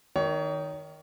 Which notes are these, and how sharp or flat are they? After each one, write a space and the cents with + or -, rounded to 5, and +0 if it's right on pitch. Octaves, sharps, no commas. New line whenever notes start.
D#3 +0 C#5 +35 C#6 +0